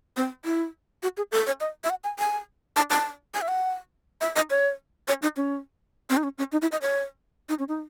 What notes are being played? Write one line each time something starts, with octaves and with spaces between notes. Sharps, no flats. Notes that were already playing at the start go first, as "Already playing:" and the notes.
C4
E4
F#4
G#4
A4
C#5
D#5
E5
F#5
G#5
G#5
A5
A5
G#5
E5
F#5
E5
D#5
C#5
C#5
D#4
C#4
C4
D#4
C#4
C#4
D#4
E4
D#5
C#5
D#4
C#4
D#4